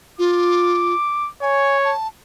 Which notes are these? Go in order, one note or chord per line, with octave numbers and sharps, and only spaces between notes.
F4 D6
C#5 G#5
A5